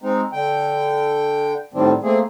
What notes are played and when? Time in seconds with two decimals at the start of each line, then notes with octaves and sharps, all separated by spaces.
0.02 G#3 C4 D#4
0.33 D3 G5
1.74 A2 D#3 G3 C4 D4
2.03 A3 A#3 C4 G#4